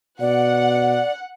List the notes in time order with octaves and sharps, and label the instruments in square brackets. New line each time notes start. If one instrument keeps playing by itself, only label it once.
[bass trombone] B2 [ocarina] D5 [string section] F#5